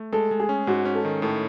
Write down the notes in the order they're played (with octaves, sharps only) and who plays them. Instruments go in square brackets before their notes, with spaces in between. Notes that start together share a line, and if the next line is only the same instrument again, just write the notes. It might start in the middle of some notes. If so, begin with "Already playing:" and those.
Already playing: [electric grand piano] A3
[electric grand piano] G#3 [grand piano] A4
[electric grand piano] G#3
[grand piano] G#4
[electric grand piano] C#4
[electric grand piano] G#2 [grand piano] F#4
[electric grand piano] C#4
[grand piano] A4
[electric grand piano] D#3
[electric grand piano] A2 [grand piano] A4